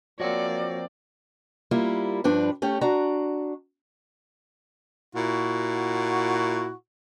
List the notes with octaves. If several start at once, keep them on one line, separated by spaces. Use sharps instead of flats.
F3 A#3 C4 F#4 C#5 D5 F#5
G3 A#3 E4 F4
G2 F3 D4 B4
A3 C#4 G4
D4 F#4 A#5
A#2 E4 F#4